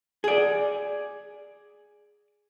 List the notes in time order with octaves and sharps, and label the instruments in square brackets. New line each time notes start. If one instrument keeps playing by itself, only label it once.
[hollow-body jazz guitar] G#4 D5